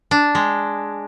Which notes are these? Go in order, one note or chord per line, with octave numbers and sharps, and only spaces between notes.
D4
G#3